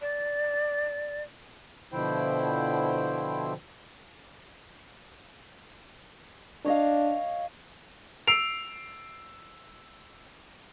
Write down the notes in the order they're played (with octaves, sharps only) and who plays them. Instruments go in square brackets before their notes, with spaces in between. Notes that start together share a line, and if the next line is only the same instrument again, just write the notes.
[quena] D5
[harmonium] B2 D3 F3 E4 C5 G5
[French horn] D4 [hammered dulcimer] C#5 D#5 F5
[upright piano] E6 C7 D7 F7